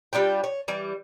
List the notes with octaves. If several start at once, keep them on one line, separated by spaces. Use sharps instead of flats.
G3 D4 F4 G5
C#5
E3 G3